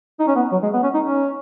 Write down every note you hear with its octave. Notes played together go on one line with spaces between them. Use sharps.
D#4
C#4
B3
F#3
G#3
B3
C#4
D#4
C#4